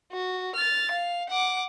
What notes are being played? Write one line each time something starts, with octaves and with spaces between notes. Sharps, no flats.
F#4
F6 A6
F5
F#5 D6